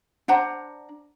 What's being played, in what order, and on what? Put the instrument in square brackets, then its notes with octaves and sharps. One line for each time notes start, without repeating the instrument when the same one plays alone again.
[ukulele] D4 C5 F#5 A#5